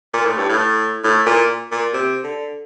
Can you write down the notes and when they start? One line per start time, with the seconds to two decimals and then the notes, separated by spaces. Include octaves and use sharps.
0.14 A#2
0.25 A2
0.38 G2
0.49 A2
1.04 A2
1.26 A#2
1.71 A#2
1.93 C3
2.24 D3